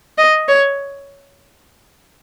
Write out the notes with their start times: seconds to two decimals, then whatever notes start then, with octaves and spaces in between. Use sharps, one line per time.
0.18 D#5
0.48 C#5